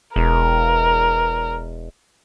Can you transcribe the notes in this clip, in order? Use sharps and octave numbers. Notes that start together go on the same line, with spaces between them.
E1 A#4